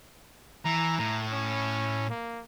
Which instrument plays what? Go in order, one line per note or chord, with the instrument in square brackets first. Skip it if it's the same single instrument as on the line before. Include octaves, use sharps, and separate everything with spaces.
[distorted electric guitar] E3 [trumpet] A#5
[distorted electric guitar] A2 [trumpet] A#5
[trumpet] C#4
A#3